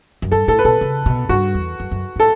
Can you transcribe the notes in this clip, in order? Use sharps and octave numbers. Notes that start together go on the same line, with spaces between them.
F#2
G2 A4
A2 A4
B4
B2 A4
C#3
B2
G2 F#4
E2
F#2
F#2
A2 A4